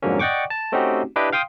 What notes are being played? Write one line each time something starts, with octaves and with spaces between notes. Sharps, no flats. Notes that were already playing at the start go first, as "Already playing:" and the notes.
F2 G#2 D3 F#3 A#3 C#4
D5 D#5 F#5 G5 C#6 D6
A5
A3 C4 C#4 D#4 F#4 G4
D4 E4 G4 B4 D#5 G5
F5 G5 C6 D#6